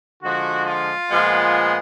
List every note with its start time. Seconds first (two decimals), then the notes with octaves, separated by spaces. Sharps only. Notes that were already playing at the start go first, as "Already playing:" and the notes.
0.23 D3 F3 G#3 F#4
0.66 F4
1.09 A#2 F3 G#3 B3